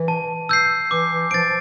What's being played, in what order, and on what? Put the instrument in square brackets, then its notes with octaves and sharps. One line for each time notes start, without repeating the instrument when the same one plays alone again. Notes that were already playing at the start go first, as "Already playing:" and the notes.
Already playing: [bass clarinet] E3
[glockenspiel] A5
E6 G6 C7
[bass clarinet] E3 [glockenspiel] D6
[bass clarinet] E3
[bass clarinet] F3 [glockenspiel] A6 D7